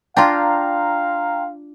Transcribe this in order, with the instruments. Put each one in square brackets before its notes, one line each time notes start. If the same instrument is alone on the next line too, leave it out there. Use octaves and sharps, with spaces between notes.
[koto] D4 F4 [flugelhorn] F5 [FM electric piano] G5 A#5 C6